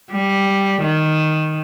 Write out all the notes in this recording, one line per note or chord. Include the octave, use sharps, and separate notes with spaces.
G3
D#3